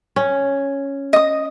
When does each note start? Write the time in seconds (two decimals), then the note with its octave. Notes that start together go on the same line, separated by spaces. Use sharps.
0.16 C#4
1.13 D#5 D#6